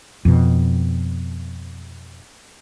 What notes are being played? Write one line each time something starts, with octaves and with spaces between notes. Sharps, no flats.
F2 B2